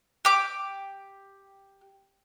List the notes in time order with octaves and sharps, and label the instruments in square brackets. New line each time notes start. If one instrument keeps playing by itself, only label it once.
[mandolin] G4 D6